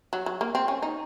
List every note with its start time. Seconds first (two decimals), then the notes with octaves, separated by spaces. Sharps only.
0.13 F#3
0.26 F#3
0.41 A#3
0.55 C4
0.68 C#4
0.82 D#4